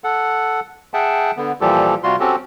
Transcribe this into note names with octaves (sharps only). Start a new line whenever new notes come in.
A4 F#5
G#4 E5 F#5 G5 A5
D3 B3
A#2 E3 F3 G3 G4 A4
C3 G3 F4 F#4 C6
C4 C#4 F#4 G4 A4